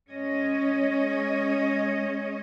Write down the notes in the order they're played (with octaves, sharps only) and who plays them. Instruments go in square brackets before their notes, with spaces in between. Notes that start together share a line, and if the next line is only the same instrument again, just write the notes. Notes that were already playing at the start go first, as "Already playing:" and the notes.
[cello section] G#3 C#4 C#5 D#5